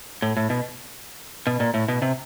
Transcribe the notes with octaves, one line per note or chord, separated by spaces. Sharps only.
A2
A2
B2
B2
A#2
A2
B2
C3